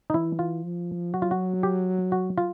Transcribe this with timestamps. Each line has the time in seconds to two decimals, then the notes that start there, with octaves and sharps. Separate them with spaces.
0.10 D#4
0.14 E3 E4
0.39 F4
0.64 F3
1.13 F#3 F#4
1.22 F4
1.31 F#4
1.63 G4
2.12 F#4
2.38 F4